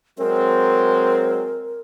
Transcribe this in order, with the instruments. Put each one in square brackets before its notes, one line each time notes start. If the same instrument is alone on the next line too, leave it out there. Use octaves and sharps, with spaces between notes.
[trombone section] F#3 G#3 C4 [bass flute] A#4